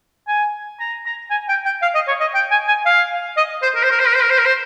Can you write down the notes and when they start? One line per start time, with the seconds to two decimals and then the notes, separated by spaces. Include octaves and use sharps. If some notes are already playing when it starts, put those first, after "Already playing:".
0.28 G#5
0.80 A#5
1.06 A#5
1.30 G#5
1.49 G5
1.65 G5
1.82 F5
1.95 D#5
2.08 C#5
2.20 D#5
2.34 G5
2.51 G#5
2.68 G#5
2.86 F5
3.37 D#5
3.62 C5
3.75 A#4
3.83 C5
3.91 A#4
3.99 C5
4.06 A#4
4.15 C5
4.22 A#4
4.30 C5
4.38 A#4
4.45 C5